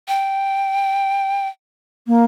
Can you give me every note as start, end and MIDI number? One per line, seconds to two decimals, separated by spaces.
0.08 1.48 79
2.07 2.24 58